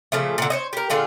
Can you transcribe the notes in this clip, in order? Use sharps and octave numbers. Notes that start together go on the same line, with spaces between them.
A#2 C#3 F3 A3
A#2 D3
C5 C#5 D#5
G4 A#4
A#2 D3 F4 G#4